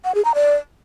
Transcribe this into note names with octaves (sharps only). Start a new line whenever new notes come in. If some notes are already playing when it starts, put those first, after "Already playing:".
F#5
G#4
A#5
D5